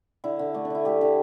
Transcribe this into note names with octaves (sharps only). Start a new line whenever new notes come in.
D3 E4
D3
A3 D4
D4
D3 E4
A3 G4
D3